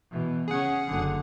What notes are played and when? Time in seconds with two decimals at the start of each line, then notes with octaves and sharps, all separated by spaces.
0.11 B2 E3
0.48 C#3 C#4 G#4 F#5
0.87 F#1 D3